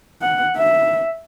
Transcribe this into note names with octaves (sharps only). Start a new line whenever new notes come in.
F#5
E5